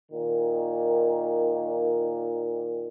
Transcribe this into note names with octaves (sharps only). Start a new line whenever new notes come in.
A#2 D#3